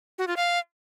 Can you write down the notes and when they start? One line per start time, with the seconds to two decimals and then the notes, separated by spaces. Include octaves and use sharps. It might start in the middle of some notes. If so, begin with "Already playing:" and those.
0.18 F#4
0.28 F4
0.37 F5